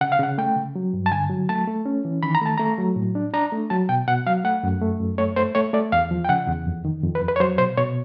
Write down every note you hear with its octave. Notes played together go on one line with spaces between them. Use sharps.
C#3 F#5
F5
C#3 F#5
A3 G5
C#3
F#3
G2
A5
D3 G#5
F#3
A3 A5
A3
C#4
E3
D#3 B5
A#5
A3 A5
A3 A#5
F#3
A2
D4
D4 A#5
A3
F#3 A5
B2 G5
B2 F#5
F#3 F5
A3 F#5
F#2
A3
F#2
A3 C#5
A3 C5
A3 C#5
A3 D5
E2 F5
F3
G5
C#3 F#5
E2
F2
D#3
F2
B4
F2
B4
C#5
F#3 C5
B2 C5
B2 C#5